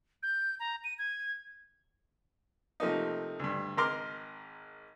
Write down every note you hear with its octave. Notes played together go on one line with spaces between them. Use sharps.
G6
A#5
D#7
G#6
C3 F3 A3 A#3 D#4
D2 G2
G#1 A#4 A#5 C6 D6 F6